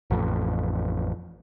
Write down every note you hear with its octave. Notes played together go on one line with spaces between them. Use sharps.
A1 F2